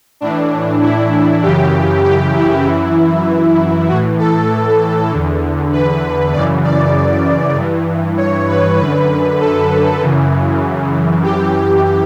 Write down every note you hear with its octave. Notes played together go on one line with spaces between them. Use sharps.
A2 E3 D4
E4
F#2 C#3 E3 G4
G4
E4
F#2 E3
A2 E3 F#4
A4
E2 D3
B4
F#2 C#3 E3 D5
D5
G2 E3
C#5
B4
F#2 D3 B4
A4
F#2 C#3 E3
F#2 E3 G4